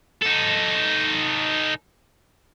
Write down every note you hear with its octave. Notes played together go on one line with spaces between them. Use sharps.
D#4 A4